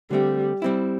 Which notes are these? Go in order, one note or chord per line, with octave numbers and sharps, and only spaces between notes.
D3 G3 A3 C4
G3 C4 E4